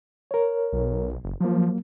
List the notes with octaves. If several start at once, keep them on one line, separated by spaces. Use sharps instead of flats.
A#4 C#5
B1
F#1
F3 F#3 A#3